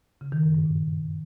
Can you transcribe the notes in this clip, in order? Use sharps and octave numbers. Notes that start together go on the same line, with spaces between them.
C#3
D#3
F#2
G2
A#2